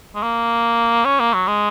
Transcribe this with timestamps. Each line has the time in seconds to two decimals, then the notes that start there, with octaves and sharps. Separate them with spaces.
0.15 G#3
0.23 A#3
1.05 C#4
1.20 A#3
1.34 F#3
1.47 G#3